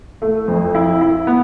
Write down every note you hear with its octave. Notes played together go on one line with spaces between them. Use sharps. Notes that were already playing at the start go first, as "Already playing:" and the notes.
A3
F2
E4
E4
B3